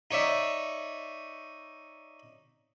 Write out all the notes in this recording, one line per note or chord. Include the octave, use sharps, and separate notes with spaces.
D#4 C#5 D5 E5